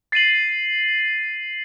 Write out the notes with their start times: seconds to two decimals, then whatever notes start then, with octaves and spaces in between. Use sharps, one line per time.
0.12 A6 C7 D#7 F#7